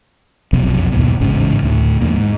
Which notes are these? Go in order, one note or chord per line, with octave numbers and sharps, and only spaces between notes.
B1 F2 C3 F#3
D#2 G#2 B2
A1 G#2 C#3 E3
D2 A2
E2 A#2
G#2